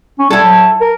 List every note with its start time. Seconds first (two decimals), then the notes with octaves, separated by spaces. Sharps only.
0.19 C#4
0.30 G3 E4 A4
0.44 F#3
0.81 A#4